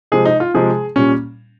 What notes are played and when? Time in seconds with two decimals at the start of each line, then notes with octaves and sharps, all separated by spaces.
0.12 C3 F3 G#3 G#4
0.25 D#4
0.40 F4
0.54 C3 F3 G#3 G#4
0.96 A#2 G3 C#4